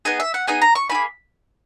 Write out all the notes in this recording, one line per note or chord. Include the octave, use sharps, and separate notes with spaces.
B3 D#4 G#4 G#5
E5
F#5
B3 D#4 G#4 G#5
A#5
C#6
E4 G#4 B5
A#3